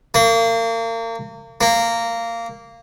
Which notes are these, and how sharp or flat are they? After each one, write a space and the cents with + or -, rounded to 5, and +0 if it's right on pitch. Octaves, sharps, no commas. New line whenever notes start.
A#3 -35
A#3 -15